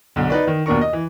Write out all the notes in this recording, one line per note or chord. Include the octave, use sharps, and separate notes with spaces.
B1 D3
D#4 B4 D5
D#3
D#2 B2 D4 A#4 C#6
D#5
E3